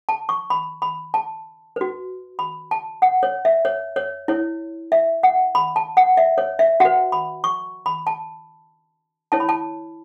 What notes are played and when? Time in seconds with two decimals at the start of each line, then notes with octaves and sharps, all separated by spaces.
0.09 A5
0.29 C#6
0.50 B5
0.82 B5
1.14 A5
1.76 F#4 B4
2.39 B5
2.71 A5
3.02 F#5
3.23 C#5
3.45 E5
3.65 C#5
3.96 C#5
4.28 E4 C#5
4.92 E5
5.23 F#5
5.55 B5
5.76 A5
5.97 F#5
6.17 E5
6.38 C#5
6.59 E5
6.80 F#4 B4 F#5
7.12 B5
7.44 C#6
7.86 B5
8.07 A5
9.32 E4 C#5 A5
9.40 B5
9.49 A5